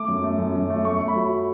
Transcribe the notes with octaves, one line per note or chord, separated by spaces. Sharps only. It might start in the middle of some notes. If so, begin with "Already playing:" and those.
Already playing: A3 D6
F#2
A3
F#2
F#2
A3
A3 C#6
A3
B5
F#3